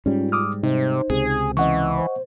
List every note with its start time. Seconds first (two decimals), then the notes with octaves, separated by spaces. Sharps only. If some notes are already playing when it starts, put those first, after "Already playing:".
0.06 G#2 G3 C#4 F4
0.32 D6 D#6 F6
0.63 C3 D#4 C5
1.10 C#2 C3 G#4
1.57 E3 C#4 D#5 F#5 C#6
1.96 C5